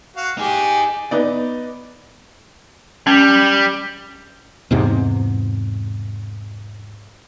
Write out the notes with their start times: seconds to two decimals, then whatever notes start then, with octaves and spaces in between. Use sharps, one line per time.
0.16 F#4 F5
0.38 D#4 G4 G#4
1.11 B3 D#4 D5
3.07 G3 C#4
4.71 E2 G#2 C3